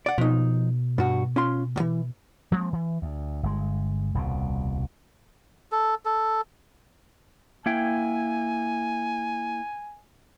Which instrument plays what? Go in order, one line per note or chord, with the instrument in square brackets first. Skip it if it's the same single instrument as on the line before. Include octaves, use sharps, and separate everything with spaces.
[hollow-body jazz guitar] D5 F#5
[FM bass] B2 [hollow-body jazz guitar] F3 D#4
[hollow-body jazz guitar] G2 F#4
C#4 F4 C6
C#2 E3
[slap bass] F3 G#3 A#3 C4
E3
D2
G1 G#3
D#1 C2 B2
[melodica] A4
A4
[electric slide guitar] A#3 E4 G5 [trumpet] G#5